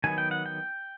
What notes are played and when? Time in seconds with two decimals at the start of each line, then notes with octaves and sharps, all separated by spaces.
0.04 D#3 F#3 B3 G#5
0.18 G5
0.31 F#5
0.46 G5